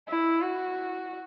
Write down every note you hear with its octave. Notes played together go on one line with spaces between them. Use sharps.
E4
F#4